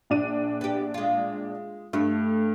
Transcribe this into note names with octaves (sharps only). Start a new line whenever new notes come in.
A#1 D4 D#7
B3 G4
G#3 F4
G2 A3